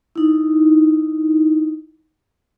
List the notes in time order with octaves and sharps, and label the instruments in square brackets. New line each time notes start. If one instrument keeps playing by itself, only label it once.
[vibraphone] D#4 E4